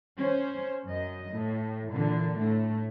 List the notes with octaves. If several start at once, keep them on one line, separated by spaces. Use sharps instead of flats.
C#4 C5
F#2 D#5
A2
A#2 D3 E3
A2 A3